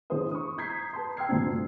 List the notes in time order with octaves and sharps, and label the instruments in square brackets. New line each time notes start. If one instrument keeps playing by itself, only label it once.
[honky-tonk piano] A1 D3 E4 G#4 C5 D#6
C#6 D#6
A#5 D#6 G6 G#6 B6 C7
B4 A5 A#5 C6
G5 A#5 E6 F6 G#6 C7
D2 G2 A#2 D3 C4 D4